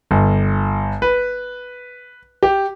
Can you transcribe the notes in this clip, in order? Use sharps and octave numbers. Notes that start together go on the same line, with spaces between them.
G1
B4
G4